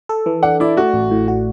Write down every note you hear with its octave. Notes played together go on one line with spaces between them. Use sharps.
A4
E3
D4 F#5
E4 D5
A3 F#4
A1
A2
F#4